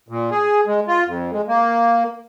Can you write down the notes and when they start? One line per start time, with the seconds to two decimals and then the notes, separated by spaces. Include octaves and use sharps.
0.09 A#2
0.31 G#4
0.67 G#3
0.88 F4
1.06 F2
1.32 G#3
1.48 A#3